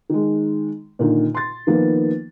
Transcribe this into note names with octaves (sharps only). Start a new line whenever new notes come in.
D#3 G#3
A#2 D3 D#3
C6 A6
D#3 F3 A#3 B3